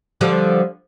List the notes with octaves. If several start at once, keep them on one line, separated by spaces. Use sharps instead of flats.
D3 F3 G3